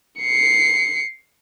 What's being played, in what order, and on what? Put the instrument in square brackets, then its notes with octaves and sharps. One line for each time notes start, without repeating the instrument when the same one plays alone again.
[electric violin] C7 C#7